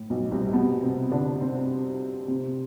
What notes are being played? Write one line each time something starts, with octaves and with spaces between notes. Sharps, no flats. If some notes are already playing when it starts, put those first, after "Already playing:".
Already playing: A2
B1 B2
C2 C3
B2 B3
C3 C4
D3 D4
C3 C4
C3 C4